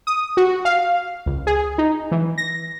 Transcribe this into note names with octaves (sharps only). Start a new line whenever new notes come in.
D#6
F#4
F5
C#2
G#4
D#4
E3
A#6